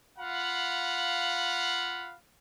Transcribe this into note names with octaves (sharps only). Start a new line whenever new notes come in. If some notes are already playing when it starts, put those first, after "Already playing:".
F4 F5 F#5 B5